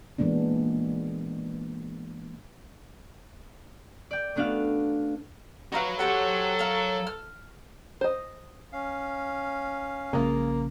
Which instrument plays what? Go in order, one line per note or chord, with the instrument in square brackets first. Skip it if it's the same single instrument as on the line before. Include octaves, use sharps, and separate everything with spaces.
[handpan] A#2 E3 G#3 B3 D4
[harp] D5 G5
A3 B3 D4 F#4 F5
[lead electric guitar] F#3 F#4 [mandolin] D#4 B4 F5
[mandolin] C4 G4 F#5 [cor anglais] A4
[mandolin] A#4 F5
F6
[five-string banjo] C5 D#5
[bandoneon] C#4 F5
[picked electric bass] A#1 C#3 [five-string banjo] G#3 F4 [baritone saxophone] A#3